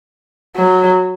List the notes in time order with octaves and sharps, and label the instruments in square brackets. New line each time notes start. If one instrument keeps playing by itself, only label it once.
[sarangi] F#3